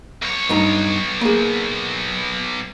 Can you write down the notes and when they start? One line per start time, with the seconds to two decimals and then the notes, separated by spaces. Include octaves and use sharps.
0.22 B1 C#5
0.49 G2 D#4 A#5
1.21 A#3 G#4